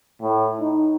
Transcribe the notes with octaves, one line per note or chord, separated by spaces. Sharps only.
A2
D#4